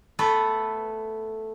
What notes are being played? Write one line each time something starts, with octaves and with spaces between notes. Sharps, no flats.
A3 B3 A4 B4